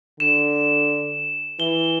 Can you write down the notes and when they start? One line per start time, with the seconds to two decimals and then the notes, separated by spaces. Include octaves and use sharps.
0.20 D3 E7
1.60 E3 G7